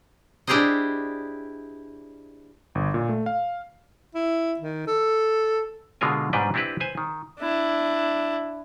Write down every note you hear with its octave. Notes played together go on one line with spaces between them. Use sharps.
D4 E4 G4 G#4 C5 D#5
G1
A#2
A3
F5
E4
D#3
A4
B2 D3 G#3 F4 A#4 G#5
G#2 B2 G3 D4 B4 G5
C4 D4 E4 G4 B4
B4 C5 G#5
D#3
D4 E4